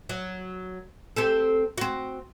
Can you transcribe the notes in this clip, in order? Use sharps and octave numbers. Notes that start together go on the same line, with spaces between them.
F#3
C4 G4 A4
C4 F#4